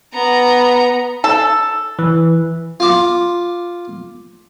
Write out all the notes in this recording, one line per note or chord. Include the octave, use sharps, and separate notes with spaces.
B3 A#5
A4
E3
F4 D6